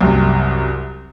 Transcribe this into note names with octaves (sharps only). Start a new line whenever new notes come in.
C2 F#2 C3